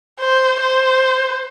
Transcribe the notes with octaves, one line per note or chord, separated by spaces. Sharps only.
C5
C5